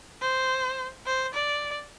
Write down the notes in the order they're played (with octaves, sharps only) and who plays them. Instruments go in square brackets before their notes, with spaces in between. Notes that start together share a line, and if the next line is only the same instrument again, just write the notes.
[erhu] C5
C5
D5